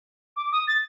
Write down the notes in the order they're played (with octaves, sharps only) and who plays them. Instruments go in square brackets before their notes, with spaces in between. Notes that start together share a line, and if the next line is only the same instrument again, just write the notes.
[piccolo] D6
D#6
A6